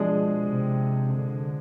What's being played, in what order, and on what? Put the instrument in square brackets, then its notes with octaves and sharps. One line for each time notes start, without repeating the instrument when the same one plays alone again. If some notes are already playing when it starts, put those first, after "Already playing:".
Already playing: [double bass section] B2 [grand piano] F3 G#3 D4 G#4
[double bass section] C3
D3